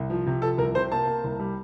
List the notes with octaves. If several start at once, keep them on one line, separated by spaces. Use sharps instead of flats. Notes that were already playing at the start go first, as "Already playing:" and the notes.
Already playing: C2
F3
C3
F3 A4
C2 A#4
C3 C5
A#3 A5
A#3
C2
G3